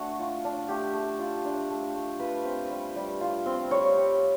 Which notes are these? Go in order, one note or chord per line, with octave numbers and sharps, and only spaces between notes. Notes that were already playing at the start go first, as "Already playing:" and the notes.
Already playing: A3 D4 F#4
F4
D4
A3 G4
A3
F4
D4
A3
A3
F4 B4
C4
G3
G3
F4
C4
G3 C#5
G3